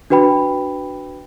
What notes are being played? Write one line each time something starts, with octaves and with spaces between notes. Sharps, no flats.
D4 F#4 B4 G5 B5